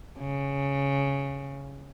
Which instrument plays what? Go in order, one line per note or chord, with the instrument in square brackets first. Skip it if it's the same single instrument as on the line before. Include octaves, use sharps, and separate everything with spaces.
[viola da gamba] C#3